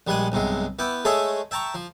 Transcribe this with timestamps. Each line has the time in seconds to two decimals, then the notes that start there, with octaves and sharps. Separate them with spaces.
0.07 A#1 G3 G#3 F#5 G#5
0.32 B1 G2 C3 G#3
0.79 B3 E4 G5 D6
1.05 G#3 A3 G#4 A4 C#5 E5
1.51 E5 G5 A5 A#5 C#6
1.74 F3